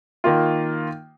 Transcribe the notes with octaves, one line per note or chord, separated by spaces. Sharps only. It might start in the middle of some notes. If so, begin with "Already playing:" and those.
D#3 A#3 F4